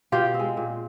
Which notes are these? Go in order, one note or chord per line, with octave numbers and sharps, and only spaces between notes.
B2 F4 G4
C4
G#3
A#2